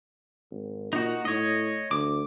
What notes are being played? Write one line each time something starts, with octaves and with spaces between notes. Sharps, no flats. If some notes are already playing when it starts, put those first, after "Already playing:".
G#1
A#2 D#4 F#4
A2 C#5 D#5
D2 D6